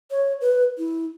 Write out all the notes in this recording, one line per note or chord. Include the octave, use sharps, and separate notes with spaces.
C#5
B4
E4